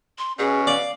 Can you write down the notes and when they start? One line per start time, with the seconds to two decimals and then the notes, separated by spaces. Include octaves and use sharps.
0.18 C6
0.39 B2 C#4 G#4
0.67 D5 F5